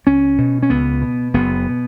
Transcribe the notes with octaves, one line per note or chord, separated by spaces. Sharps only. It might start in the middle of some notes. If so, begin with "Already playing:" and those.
C#2 C#4
B2
C#4
C#2 B3
B2
F#1 B3
B2